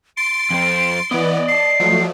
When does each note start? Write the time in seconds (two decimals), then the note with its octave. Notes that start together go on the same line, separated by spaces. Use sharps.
0.17 C6 A6 C7 D7
0.51 F2 C4
1.11 E3 B3 D5 D#5
1.48 A5 C7
1.80 F3 F#3 A3